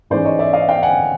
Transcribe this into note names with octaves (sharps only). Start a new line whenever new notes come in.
G#2 E3 G#3 C#4 C5 D5
C#5 D#5
D5 E5
D#5 F5
F5 G5
F#5 G#5